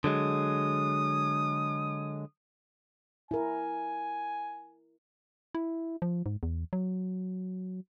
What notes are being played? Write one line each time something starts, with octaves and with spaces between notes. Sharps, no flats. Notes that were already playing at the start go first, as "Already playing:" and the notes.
D3 F#3 G#3 D#6
E4 A#4 G#5
E4
F3
G#2
E2
F#3